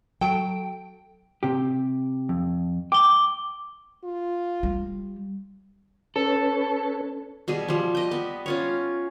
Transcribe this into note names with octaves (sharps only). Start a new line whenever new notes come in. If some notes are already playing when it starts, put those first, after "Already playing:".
F#3 A4 G5 D7
C3 G4
F2
G5 D6 G7
F4
G3
C#4 A4 B4 C#5
B2 G3 G#4
F3 G3
G4 D#5 G5
B3
C#4 F4 C#5